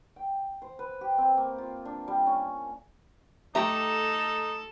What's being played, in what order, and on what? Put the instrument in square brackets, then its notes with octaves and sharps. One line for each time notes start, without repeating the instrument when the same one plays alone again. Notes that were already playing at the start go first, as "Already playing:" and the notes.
[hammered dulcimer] G5
C5
B4
G4
C4
A#3
F4
D4
G3
C#4
[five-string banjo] A3 G4 E5 [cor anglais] D#4 [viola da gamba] A4 [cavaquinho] A#5